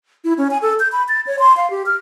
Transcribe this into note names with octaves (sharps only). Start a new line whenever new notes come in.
E4
C#4
G#5
A4
G6
B5
A6
C#5
C6
F5
G4
F6